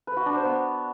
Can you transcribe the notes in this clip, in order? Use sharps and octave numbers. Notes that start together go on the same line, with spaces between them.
B4
F#4
D4
C5
B3